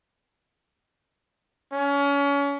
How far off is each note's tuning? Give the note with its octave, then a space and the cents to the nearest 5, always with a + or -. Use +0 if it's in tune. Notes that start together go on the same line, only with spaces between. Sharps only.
C#4 +30